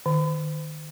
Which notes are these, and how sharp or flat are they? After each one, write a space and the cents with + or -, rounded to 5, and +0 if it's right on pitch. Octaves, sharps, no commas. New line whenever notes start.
D#3 -20